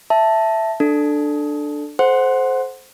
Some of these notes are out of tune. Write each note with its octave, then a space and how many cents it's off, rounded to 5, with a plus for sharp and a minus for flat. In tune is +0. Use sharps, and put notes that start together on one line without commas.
E5 +0 A5 +0
D4 +10 A4 +0
A4 -35 C5 +0 F#5 -5